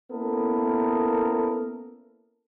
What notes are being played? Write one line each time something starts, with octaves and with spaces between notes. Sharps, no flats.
A#3 B3 C#4 E4 A4 A#4